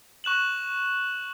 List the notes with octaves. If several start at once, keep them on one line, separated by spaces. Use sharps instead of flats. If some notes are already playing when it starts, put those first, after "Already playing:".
C#6 F#6 E7 F#7